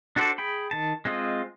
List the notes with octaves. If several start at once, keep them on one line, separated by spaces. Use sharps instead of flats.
D4 F#4 A4 C5 D5
G#4 G5 B5
D#3 A5
G#3 C4 F4 D#5